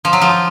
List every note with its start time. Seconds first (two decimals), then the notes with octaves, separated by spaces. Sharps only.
0.05 F3
0.13 F#3
0.21 F3